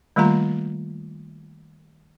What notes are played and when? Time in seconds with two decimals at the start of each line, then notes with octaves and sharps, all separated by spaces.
0.16 D#3 G3 A3 A#3 F4 A#5